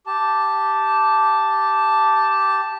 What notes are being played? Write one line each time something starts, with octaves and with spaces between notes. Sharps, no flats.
G4 A5